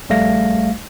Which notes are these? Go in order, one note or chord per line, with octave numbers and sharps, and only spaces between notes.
A#1 G3 A3 F5 A#6